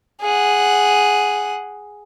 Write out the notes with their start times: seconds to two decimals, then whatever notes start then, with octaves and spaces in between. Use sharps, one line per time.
0.21 G#4 F#5